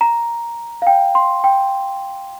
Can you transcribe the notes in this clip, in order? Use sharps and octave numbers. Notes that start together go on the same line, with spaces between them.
A#5
F5
G5
C6
G5